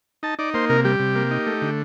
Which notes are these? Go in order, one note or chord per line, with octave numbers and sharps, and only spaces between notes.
D#4 A5
D#4 D5
A#3 C5
C3 A#4
G3 G4
C3
A#3
D#4
A3
D3